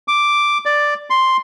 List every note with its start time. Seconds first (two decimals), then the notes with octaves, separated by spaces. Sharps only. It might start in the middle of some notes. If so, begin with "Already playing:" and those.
0.08 D6
0.66 D5
1.10 C6